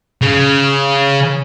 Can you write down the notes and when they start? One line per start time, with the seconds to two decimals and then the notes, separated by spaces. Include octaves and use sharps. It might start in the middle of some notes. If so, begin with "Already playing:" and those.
0.22 C#3